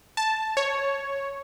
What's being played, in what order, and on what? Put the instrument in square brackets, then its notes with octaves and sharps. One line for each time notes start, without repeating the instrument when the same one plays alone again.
[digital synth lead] A5
C#5